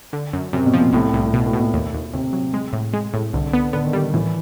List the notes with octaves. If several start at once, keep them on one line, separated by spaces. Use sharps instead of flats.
D3
F#2
F#2 C3
B2
F3
A#2
C2 A2
C2
B2
A2
B2
A#2
D#2
D#2
D#2 C3
F#3
G#3
A2
G#3
A2
C2 D3
B3
D3 B3
D#3
D3 G3
A2 E3